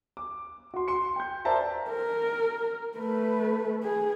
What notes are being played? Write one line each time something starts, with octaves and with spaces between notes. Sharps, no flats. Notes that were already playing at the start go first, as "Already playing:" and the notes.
D6
F#4 C6
C6 C#7
G5 G6
A#4 C5 D5 E5 A5 A#5
A#4
A3 B4
G#4